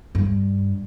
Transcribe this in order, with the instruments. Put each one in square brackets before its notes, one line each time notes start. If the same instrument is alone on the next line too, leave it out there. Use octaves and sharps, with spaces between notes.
[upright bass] G2